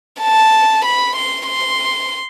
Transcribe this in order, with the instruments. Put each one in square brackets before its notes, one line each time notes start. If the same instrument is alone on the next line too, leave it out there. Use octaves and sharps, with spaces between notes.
[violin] A5
B5
C6
C6